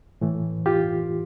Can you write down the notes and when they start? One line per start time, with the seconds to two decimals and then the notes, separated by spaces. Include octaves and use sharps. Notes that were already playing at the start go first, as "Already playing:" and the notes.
0.21 A2 E3 A3
0.66 F4 G4